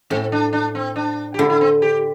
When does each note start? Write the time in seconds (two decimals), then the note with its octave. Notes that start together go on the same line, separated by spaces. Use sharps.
0.10 A2 C4
0.32 D4
0.53 D4
0.75 C4
0.96 D4
1.34 G4
1.39 D3 E4
1.50 E4
1.61 C4
1.82 G4